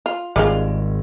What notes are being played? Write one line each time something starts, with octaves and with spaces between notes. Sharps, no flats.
F4
G#1 G3 G#3 F4